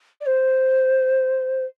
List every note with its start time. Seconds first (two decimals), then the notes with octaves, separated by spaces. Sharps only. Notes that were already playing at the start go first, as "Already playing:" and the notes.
0.21 D5
0.26 C5